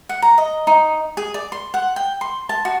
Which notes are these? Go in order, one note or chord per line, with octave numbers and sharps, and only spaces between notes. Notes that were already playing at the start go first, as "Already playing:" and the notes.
F#5
A#5
D#5
D#4
G#4
D5
C6
F#5
G5
C6
A5
F#4